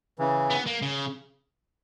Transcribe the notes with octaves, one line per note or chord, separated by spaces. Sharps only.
C#3 E3
B3
A#3
C#3